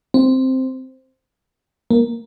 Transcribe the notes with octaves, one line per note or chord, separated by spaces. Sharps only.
C4
A#3